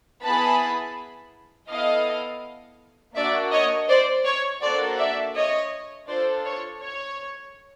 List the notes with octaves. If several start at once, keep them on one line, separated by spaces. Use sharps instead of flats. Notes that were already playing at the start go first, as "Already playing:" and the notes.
B3 E4 G#4 A5 B5
B3 E4 A4 D#5 F5
A#3 D4 F#4 D5 E5
C#5 D#5
C5 D5
C#5
A#3 D4 F#4 A4 C5 D5
D5 E5
C#5 D#5
D4 F4 A4 C5 D5
C#5
C#5